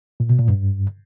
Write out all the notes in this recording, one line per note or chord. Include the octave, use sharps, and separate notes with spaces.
A#2
B2
A#2
G2